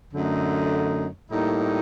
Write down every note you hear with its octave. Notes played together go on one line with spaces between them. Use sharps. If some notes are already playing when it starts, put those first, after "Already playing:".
F#2 D3 A3 D#4
A2 G3 A#3 D#4